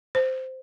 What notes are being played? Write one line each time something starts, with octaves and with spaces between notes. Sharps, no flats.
C5